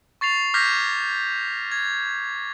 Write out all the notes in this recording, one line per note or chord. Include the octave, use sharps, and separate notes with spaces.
C#6 A6 C7 F7
D6 F6 G6 G#6 A#6 B6
G#6